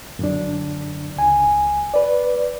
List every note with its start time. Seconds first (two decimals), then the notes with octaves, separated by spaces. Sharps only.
0.19 F#2 D3 D4
1.17 C#2 G#5
1.94 B4 D5